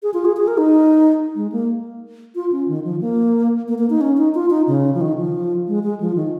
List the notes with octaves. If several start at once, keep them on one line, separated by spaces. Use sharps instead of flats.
G#4
F4
G#4
G#4
A#4
D#4
G#3
A#3
F4
C#4
D#3
F3
A#3
A#3
A#3
D#4
C#4
D#4
F4
D#4
C#3
F3
D#3
F3
G#3
G#3
F3
D#3